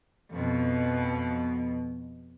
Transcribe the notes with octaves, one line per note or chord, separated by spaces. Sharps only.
F2 B2